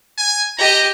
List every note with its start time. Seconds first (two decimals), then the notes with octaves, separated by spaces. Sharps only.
0.18 G#5
0.58 G4 D#5 A#5